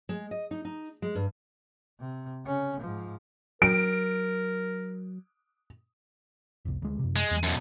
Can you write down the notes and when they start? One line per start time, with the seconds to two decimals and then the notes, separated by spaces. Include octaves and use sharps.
0.09 G#3
0.31 D#5
0.51 D#4
0.65 D#4
1.02 G#3
1.15 G2
2.00 C3
2.45 C#3 C#4
2.80 G#2 F3
3.62 F#3 A#4 D7
6.65 F1 C2
6.82 D2 G#3
6.99 F#2 C3
7.16 G#3
7.31 E2
7.43 F#2 B2